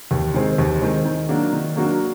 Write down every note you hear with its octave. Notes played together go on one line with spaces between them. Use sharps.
D#2
D#3 G#3 C4
D#2
D#3 G#3 C4
D#3
F#3 A#3 D4 F#4
D#3
F#3 A#3 D4 F#4